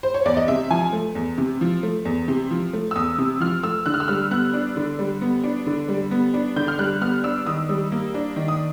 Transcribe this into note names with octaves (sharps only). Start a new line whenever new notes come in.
C5
C#5
E2 D5
D#5
C3 E5
F3 G#5
A3
E2
C3
F3
A3
E2
C3
F3
A3
E6
E2 D#6
C3
F3 F6
A3 E6
D3 F#6
F6
E6
G3 F6
B3 F#6
D4
D3
G3
B3
D4
D3
G3
B3
D4
D3 G6
F6
G3 F#6
B3 F6
D4 E6
D#3 D#6
G3
A#3
D4
D#3
D#6